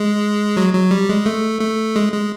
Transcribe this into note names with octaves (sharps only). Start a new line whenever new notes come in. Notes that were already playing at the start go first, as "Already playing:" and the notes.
Already playing: G#3
F#3
F#3
G3
G#3
A3
A3
G#3
G#3